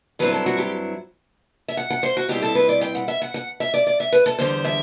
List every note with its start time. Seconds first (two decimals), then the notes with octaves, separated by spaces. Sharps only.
0.19 G2 F#3 C4 E4 B4
0.32 A4
0.46 F#4
0.58 G4
1.68 E5
1.77 F#5
1.90 F#5
2.03 C5
2.17 F#4
2.28 B2 G3 C4 E4 G4
2.42 A4
2.55 B4
2.69 D5
2.81 G5
2.95 F#5
3.08 E5
3.22 F#5
3.34 F#5
3.60 E5
3.74 D5
3.87 D5
4.00 E5
4.12 B4
4.26 A4
4.39 E2 D3 G3 C5
4.65 E5